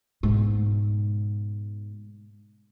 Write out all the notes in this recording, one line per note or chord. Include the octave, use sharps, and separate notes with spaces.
G#2 B2